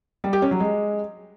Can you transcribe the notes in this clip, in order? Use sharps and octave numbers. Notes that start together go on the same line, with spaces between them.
G3
G4
C#4
F#3
G#3